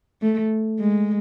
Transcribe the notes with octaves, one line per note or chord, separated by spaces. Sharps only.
A3
G#3